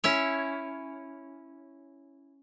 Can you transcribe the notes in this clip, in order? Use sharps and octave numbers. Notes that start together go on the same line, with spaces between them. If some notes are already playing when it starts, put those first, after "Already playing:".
C#4 E4 C#5